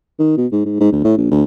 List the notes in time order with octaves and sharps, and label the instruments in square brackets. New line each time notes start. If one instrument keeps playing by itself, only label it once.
[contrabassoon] D#3
B2
G#2
G#2
G#2
D2
A2
A#1
D2